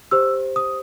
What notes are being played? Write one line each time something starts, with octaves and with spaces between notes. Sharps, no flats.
G4 C5 E6
D#6